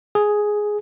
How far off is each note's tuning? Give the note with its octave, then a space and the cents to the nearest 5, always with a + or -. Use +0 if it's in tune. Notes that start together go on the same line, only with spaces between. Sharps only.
G#4 +5